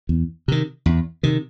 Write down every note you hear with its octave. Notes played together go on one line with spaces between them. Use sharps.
E2
C3 D#3
E2
C3 D#3